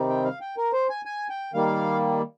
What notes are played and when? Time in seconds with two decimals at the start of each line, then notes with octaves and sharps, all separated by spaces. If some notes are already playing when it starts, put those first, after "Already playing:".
Already playing: C3 D#3 G3 C4 D#4
0.09 G5
0.24 F5
0.41 G5
0.57 A#4
0.73 C5
0.89 G#5
1.05 G#5
1.30 G5
1.54 D#3 G3 A#3 F5